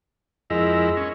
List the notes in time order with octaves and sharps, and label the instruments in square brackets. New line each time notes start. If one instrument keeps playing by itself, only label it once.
[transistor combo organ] F2 E4 A#4 [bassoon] G#3
[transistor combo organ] C#4